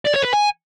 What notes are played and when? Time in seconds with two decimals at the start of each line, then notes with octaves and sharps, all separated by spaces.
0.05 D5
0.14 C#5
0.24 B4
0.33 G#5